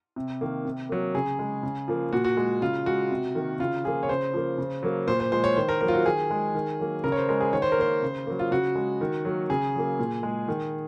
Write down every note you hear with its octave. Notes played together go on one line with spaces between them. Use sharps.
C3
D#3 A#3
C3
F#3 A#3
C#3 G#4
G#3
C#3
F3 A#3
A#2 F#4
F#4
G#3
C#3 F4
G#3 F#4
C3
D#3 A#3
C#3 F4
F3 A#3 G#4
C#5
C#3 C5
F3 A#3
C#3
F#3 A#3
A#2 C5
C5
F3 G#3 C5
C#5
D#3 C5
A#4
F#3 A#3 A#4
F4
F#4
D#3 G#4
G#3
D#3
F#3 A#3
C#3 A#4
C#5
C5
G#3 A#4
G#4
D#3 C#5
C5
A#4
A#3 C5
C#3
F#3 A#3
F4
C#3 F#4
G#3
D#3
F#3 A#3
C#3 G#4
F#3 A#3
A#2
G#3
D#3